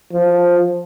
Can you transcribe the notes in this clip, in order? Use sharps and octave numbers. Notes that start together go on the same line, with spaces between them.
F3